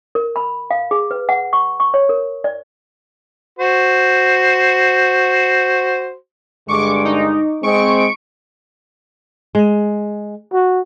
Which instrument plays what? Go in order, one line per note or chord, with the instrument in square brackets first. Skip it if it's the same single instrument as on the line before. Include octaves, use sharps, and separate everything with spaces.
[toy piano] A#4
B5
F5
G#4
B4
F#5
C#6
C#6
C#5
A#4
D5
[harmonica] F#4 C5
[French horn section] G2 D3 G#3 [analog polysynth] C#6 D6
[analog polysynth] D#4
[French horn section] G#3 C4 [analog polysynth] C#6 D7
[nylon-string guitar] G#3
[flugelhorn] F#4